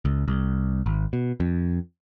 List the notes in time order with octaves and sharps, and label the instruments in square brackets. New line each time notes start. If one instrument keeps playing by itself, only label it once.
[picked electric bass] C#2
C2
G#1
B2
F2